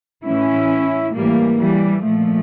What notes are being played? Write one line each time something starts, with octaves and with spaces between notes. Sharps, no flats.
A2 E3 C#4 E4
A2 E3 G3 A#3
E3 G3
A#2 F3 A3